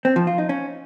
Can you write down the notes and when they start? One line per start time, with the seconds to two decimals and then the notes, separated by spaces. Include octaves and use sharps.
0.05 C4
0.16 F3
0.27 F4
0.38 D#4
0.49 C#4